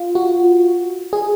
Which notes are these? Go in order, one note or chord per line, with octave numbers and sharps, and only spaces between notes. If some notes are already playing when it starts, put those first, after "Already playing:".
Already playing: F4
F#4
G#4